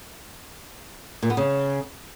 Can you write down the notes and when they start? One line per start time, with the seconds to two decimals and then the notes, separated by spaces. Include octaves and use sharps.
1.23 A#2
1.30 B3
1.37 C#3